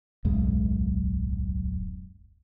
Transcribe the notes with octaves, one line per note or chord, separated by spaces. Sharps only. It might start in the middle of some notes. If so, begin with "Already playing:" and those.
D1 B1 F#2 G#3